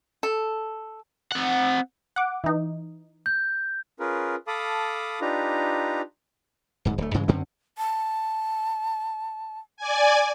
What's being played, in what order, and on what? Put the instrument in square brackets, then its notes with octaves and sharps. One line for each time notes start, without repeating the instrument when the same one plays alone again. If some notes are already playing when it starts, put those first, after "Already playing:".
[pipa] A4
[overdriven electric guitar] C4 F#5
[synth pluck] F#5 D6
E3 D#4
[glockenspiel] G6
[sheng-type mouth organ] C#4 F4 G#4 A#4 B4
A4 F5 A5 B5 D6 D#6
D4 D#4 F4 G4 B4 A#5
[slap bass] D1 G#2
D1 A3
G2 C#3 E3 G#3
F#2 D3 C4 C#4
[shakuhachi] A5
[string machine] D5 G#5